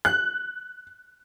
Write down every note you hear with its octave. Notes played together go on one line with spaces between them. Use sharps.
F#6